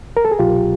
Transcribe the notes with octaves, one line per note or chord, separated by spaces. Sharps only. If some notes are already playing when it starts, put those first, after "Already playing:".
A#4
A4
G#4
C2 B2 F#3 F4 G4